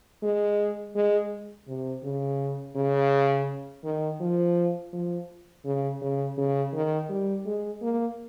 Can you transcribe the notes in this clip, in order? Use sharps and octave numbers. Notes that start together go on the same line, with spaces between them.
G#3
G#3
C3
C#3
C#3
D#3
F3
F3
C#3
C#3
C#3
D#3
G3
G#3
A#3